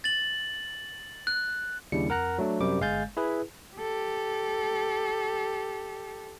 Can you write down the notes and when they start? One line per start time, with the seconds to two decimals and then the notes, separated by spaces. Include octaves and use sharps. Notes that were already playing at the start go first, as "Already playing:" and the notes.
0.04 A6 F#7
1.27 F#6
1.92 D#2 C#3 G3 D4 E4 C#7
2.09 F2 A#4 F#5 A#5 F#6
2.38 F#3 A3 D4
2.60 F#2 C3 G3 C5 D6
2.80 G1 G#3 F5 G#5 G6 A6
3.17 E4 G#4 B4
3.77 G4 A4